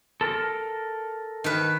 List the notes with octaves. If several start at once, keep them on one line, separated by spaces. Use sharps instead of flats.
A4 A#4
D#3 B4